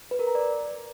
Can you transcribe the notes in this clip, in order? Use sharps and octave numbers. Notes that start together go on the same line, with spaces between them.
B4
A#4
A#5
D5